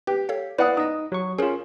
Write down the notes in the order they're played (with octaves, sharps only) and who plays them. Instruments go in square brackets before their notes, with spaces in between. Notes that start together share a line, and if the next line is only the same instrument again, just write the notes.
[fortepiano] G4 [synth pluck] B4
[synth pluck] A4 C#5 F5
[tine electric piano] E4 F5 [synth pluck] B4 [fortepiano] D5 F#5 D#6
[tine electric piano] D#4 D#5 [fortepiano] D#6
[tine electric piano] F#3 F#4 C#6
[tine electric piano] C#4 F4 [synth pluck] G#4 A#4